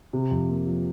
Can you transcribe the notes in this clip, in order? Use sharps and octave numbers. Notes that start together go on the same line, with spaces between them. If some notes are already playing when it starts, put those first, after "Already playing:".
C3
F2
A#3
F3